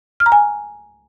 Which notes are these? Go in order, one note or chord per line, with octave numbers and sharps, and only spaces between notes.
F6
A#5
G#5